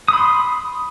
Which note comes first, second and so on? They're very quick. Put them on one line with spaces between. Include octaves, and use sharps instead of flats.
D#6 B5 C6